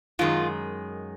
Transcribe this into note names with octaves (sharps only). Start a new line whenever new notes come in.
F#2 D#3 G#3 F4